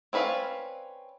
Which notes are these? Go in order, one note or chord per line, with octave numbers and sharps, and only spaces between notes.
C4 C#4 B4 D5 F5